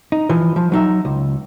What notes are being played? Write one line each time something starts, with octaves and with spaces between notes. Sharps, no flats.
D#4
E3 F3
F3
F#3 D#4 E5
C#2